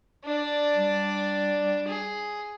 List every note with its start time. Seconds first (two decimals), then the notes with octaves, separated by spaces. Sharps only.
0.24 D4 D5
0.75 G3
1.88 G#4